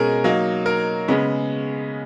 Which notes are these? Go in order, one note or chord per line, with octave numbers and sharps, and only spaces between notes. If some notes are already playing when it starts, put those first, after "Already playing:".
Already playing: B2 G#3 C#4 G#4 A#4
F#3 A#3 D#4
A#4
C#3 G#3 B3